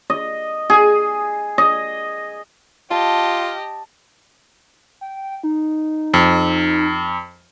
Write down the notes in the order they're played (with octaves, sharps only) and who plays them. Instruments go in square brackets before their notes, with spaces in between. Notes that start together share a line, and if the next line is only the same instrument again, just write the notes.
[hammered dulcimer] D#5
G#4
D#5
[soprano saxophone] F4 [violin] G4 D#5 [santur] A5
[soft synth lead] G5
D#4
[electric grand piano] F2